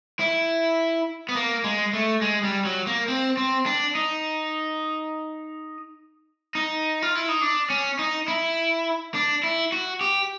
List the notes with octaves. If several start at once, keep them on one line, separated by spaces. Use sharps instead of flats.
E4
B3
A#3
G#3
A3
G#3
G3
F#3
A#3
C4
C4
D4
D#4
D#4
F4
E4
D#4
D4
C#4
D#4
E4
D4
E4
F#4
G4